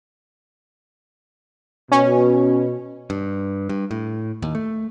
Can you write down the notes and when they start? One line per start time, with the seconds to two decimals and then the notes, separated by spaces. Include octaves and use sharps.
1.92 B2 C#4
3.10 G2
3.69 G2
3.91 A2
4.42 D#2
4.55 A3